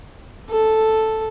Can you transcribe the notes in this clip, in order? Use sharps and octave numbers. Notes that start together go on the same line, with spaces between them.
A4